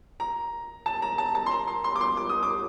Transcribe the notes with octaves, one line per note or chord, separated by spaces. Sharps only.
A#5
A5
A#5
A5
A5
C6
A#5
C6
C6
D6
C6
D6
D#6
D6